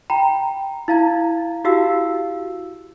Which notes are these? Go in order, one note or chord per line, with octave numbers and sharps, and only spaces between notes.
G5 A#5 B5
E4 F5 A#5 G#6
E4 F#4 G4 F5 E6